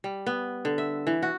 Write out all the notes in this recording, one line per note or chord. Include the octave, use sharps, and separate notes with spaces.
G3
B3
D3
E5
E3
F#4